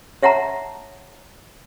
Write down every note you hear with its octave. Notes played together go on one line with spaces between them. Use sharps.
C#5 E5 F#5 A5 A#5